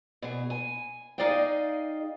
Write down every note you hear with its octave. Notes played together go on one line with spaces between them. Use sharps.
B2 G#4
G#5
D#4 G#4 D5 D#5 F5 G5